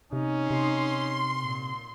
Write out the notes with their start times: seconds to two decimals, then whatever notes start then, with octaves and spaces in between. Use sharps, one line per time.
0.13 C3 C#4 D#4
0.51 C3 C6
1.40 A#2